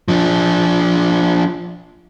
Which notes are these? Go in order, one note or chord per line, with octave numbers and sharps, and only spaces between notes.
F3 D4